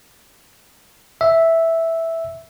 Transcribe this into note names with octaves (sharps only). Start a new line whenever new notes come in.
E5